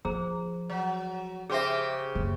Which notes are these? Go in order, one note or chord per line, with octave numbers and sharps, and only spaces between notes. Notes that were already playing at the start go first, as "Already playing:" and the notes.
F3 G#4 C5 A#5
F#3
C#3 G4 G#4 C5 E5
F#1 E4